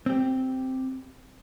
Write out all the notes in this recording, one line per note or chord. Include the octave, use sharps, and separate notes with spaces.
C4 G4